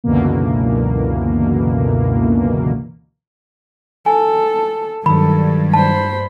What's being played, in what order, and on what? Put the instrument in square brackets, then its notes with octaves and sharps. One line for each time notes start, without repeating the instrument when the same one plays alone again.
[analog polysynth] C#2 F#2 B2 D3 E3 A#3
[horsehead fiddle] A4 [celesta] G#5
[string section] G2 [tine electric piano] D#3 F#3 [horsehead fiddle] A4 [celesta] B5
[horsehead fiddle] C5 B5 [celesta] A5